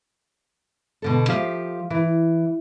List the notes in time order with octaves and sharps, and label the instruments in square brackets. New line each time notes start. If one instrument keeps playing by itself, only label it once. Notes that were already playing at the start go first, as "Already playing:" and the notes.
[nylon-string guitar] B2 D3 A4
F3 G4 E5 F5
E3